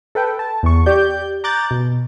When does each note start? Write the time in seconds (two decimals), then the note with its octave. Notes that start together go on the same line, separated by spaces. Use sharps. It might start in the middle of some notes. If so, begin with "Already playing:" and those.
0.15 A4 B4 G5
0.39 A5
0.63 E2 C#6
0.86 G4 D5 G6
1.44 A#5 D6 F#6 G6 A6
1.71 B2